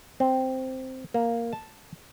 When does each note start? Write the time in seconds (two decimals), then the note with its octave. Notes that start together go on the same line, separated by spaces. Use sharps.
0.20 C4
1.14 A#3
1.53 A5